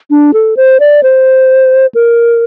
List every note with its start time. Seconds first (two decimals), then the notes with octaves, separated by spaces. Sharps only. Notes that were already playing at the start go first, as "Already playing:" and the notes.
0.10 D4
0.34 A4
0.57 C5
0.80 D5
1.03 C5
1.95 A#4